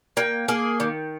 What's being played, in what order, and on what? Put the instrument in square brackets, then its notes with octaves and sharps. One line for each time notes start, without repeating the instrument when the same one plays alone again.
[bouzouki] A#3 G5
A#3 G#4
D#3